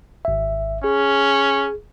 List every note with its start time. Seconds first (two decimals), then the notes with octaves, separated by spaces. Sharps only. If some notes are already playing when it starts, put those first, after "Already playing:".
0.25 G#1 E5
0.84 C#4 G#4